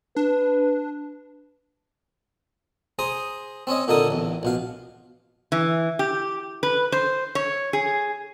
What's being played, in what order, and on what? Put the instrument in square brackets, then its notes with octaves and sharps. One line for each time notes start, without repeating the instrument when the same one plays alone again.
[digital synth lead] D4 [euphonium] B4
[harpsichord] G#4 C5 A#5 D#6
C4 C#4 C#5 D#5
A#2 D3 D#4 A4 A#4 D#6
A1 E2
A#1 B2 F5
[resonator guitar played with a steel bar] E3
G4
B4
C5
C#5
G#4